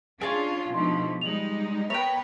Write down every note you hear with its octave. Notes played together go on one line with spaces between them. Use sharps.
C#4 D4 F4 G#4 A5
B2 F3 A3 D4 D#4 C6
G3 G#3 D#4 F7 F#7
B3 A#4 B4 C#5 E5 G5